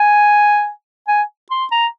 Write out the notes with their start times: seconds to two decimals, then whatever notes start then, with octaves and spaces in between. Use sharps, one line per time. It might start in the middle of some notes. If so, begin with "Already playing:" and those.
Already playing: G#5
1.08 G#5
1.51 C6
1.72 A#5